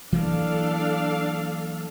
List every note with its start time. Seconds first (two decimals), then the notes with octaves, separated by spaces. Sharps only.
0.12 E3 F#3 A#3 D4 A4 F5